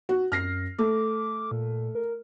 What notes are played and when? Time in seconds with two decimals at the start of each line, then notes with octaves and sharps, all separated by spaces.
0.09 F#4
0.32 F#2 F6 A#6 C7
0.78 A3 D6
1.51 A#2
1.95 A#4